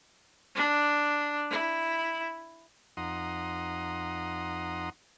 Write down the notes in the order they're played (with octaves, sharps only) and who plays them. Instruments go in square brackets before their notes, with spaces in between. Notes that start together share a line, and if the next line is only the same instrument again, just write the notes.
[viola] D4
E4
[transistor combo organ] F2 D#4 F#5 A#5 C6 D#6